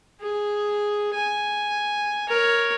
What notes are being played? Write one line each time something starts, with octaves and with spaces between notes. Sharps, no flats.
G#4
G#5
A#4 C#5